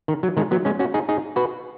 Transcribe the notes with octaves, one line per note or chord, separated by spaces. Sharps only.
D#3
F#3
D#3 G#3
F#3 B3
G#3 C#4
C#4 F#4
D#4 G#4
D#4 G#4
F#4 B4